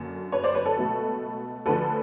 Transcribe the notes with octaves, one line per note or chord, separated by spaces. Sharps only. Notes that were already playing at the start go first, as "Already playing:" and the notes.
Already playing: F#2 D3 F#3 A#3
B4 C#5
C5 D5
B4 C#5
A4 B4
C#2 B2 F#3 A3
D2 D3 F3 A4 B4